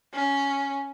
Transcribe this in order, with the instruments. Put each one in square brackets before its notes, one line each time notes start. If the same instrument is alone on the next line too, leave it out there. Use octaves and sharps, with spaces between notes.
[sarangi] C#4